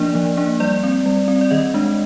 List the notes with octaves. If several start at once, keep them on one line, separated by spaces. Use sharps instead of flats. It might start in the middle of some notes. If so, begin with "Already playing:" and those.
Already playing: F3 A#3 D4 D5
F3
A#3 D4
G3 D5
C4
G3
C4
D5
D#3 D#5
G#3 D4